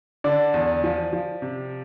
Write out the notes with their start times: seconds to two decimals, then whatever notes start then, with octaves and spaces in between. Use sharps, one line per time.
0.24 D3 D5
0.54 E2
0.84 F3
1.13 F3
1.42 C3